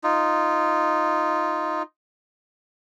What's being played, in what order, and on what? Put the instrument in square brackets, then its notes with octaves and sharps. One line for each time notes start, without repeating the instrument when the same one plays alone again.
[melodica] D#4 F4